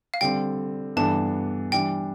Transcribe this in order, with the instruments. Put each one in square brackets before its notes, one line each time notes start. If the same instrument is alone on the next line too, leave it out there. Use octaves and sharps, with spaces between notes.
[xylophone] F5
[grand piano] D3 G3 C4 [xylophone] G5
[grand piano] G2 E3 B3 D4 A4 [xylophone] A5
[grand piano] E3 G3 D4 [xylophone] G5